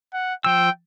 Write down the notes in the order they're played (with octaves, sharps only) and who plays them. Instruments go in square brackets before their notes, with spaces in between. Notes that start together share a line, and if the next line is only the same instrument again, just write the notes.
[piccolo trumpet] F#5
[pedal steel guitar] F3 E6 [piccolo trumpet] G5